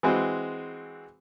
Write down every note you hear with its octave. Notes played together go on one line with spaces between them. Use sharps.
E3 G#3 C4 F#4